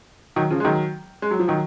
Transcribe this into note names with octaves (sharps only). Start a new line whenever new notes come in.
D#3 F#3
C#3 F3
G#3
D#3 F#3
G#3
F#3
F3
D#3 F#3